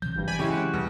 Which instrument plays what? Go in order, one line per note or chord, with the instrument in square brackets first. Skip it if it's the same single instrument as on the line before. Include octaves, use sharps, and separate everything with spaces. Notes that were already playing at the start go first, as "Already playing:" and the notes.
[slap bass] C3 E3 F#3 [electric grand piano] G6
[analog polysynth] G#1 G2
D5 G#5 B5
[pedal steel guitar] C#3 [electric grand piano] G#3 E4 G4 [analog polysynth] C#4
[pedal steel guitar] F#4
[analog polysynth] E2 G3 [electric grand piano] B2